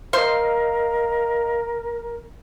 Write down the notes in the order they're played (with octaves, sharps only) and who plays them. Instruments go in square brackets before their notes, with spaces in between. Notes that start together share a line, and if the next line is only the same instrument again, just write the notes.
[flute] A#4 [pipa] C5 C6 [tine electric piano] D#5 F5